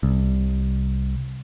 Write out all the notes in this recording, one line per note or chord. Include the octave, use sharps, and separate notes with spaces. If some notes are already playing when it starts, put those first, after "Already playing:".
C2